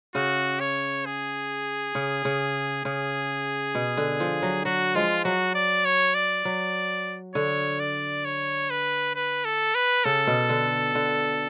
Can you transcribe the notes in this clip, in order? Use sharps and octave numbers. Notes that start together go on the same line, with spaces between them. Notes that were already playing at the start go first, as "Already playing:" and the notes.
C#3 F#4
C#5
G#4
C#3
C#3
C#3 G#4
B2
D3
F3
F#3
F#3 F#4
F3 G#3 F4
F#3 F#4
D5
C#5
D5
F#3
D3 C#5
D5
C#5
B4
B4
A4
B4
C#3 A4
B2
D3
D3